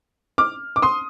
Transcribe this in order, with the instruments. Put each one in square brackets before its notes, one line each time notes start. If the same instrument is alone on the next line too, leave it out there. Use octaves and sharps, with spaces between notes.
[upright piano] D6 F6
D6
C6 D#6